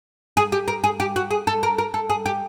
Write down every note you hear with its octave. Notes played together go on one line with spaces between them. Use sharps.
G#4
G4
A#4
G#4
G4
F#4
G#4
A4
A#4
A#4
A4
G#4
G4